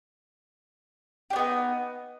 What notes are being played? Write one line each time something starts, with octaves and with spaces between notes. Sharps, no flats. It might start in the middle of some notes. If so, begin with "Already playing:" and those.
B3 D4 D#4 G4